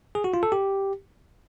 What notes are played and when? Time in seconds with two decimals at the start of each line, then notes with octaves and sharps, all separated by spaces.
0.15 G#4
0.24 F#4
0.34 F4
0.43 A4
0.52 G4